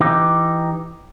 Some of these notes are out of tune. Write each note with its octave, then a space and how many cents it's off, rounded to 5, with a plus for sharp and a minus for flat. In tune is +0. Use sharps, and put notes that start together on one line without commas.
E3 +10 D#4 +0 G4 +0